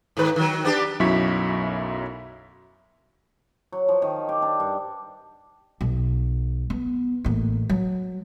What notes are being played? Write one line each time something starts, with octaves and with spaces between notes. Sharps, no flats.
G#2 D#3 B4
D#3 F#3
B3 D4 G4
B1 F#2 F#3 E4 C#6 B6
F#3
F3
D#3
G4
D4
G2
B1
B3
A1 A#3
F#3